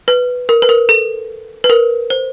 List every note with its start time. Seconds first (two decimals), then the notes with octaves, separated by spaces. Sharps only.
0.08 B4
0.49 A#4
0.62 B4
0.69 A#4
0.89 A4
1.64 B4
1.70 A#4
2.10 C5